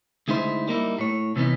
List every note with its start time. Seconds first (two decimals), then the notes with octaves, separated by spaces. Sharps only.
0.28 D2 G#3 D#4 E4 C5
0.67 G3 A#3 D#4 E4
0.98 A2 C#5
1.36 C3 E3 B3 C#4 D#4